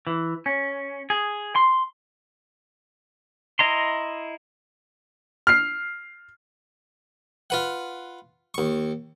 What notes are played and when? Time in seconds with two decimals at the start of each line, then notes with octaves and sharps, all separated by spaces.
0.07 E3
0.46 C#4
1.10 G#4
1.56 C6
3.59 E4 D#5 A#5 C6
5.47 F6 C7
7.50 F4 B4 F#5
8.54 D#2 C#6